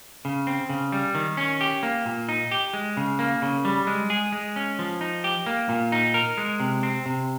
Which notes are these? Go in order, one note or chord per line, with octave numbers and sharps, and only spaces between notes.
C#3
C4
C#3
G3
D#3
C#4
G4
A#3
A#2
D#4
G4
G#3
C#3
A#3
C#3
G3
G#3
G#4
G#3
C#4
F3
D#4
G4
A#3
A#2
D#4
A#4
G#3
C3
C4
C3